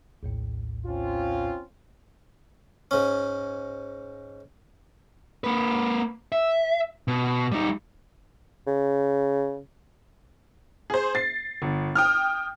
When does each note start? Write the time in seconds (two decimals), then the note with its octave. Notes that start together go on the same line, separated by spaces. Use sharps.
0.23 A#1 D#2 A2
0.86 C4 C#4 F4
2.91 G#2 C#4
5.44 A#3 B4
6.32 E5
7.08 B2
7.52 G3 D#4
8.67 C#3
10.90 G#4 C5
11.15 A6 C7
11.62 G1
11.95 G5 D#6 F6